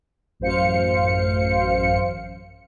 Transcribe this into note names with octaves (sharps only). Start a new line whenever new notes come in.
A1 F#2 C5 F5 C#7